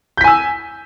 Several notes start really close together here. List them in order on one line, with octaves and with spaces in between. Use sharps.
G6 B6 G#5 E6